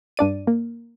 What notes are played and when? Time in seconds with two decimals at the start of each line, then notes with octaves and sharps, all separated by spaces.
0.17 G2 D4 D5 D#7
0.47 A#3